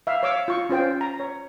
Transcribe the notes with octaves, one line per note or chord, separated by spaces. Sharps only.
E5 F5
C#5 F5 D6 E6
F4 C#6
C#4 F4 C5 G5
A#5
C#5